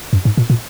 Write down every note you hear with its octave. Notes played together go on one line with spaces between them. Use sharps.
F#2
G#2
A#2
A#2